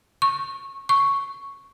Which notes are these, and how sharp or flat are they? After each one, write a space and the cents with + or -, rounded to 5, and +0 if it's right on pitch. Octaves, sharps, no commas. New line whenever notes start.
C#6 -20
C#6 +0